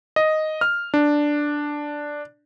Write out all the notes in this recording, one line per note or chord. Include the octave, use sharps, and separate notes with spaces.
D#5
F6
D4